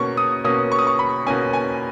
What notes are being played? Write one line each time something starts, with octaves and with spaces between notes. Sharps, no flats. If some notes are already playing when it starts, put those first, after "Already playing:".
Already playing: B2 A#3 C#4 C#6
D#6
B2 A#3 C#4 D#6
C#6
D#6
C#6
B5
B2 A#3 C#4 G#5
G#5